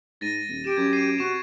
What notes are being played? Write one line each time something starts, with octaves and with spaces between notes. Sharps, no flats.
G#2 A6 A#6 D#7
D#1
G4 D7 E7
F#2 G#6
G#6 C7 D#7
C3 F#4 C#6 E7